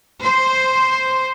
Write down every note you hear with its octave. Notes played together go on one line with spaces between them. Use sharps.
C5